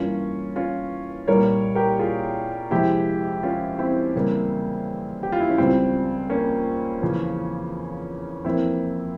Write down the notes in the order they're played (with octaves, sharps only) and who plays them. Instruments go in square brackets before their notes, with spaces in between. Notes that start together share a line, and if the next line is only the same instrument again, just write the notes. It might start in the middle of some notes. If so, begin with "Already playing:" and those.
Already playing: [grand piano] G2 E3 A#3 C#4 F4
C#4 F4
C2 A#2 G3 A#3 A#4 C#5
G4 A#4
F4 G#4
F2 C3 F3 G#3 E4 G4
C#4 F4
C4 E4
E2 C#3 G3 A#3
G4
F4
E4
C#4
C#2 C#3 G3 C4
A#3 C#4
E2 C#3 F3
F2 E3 A#3 C4 E4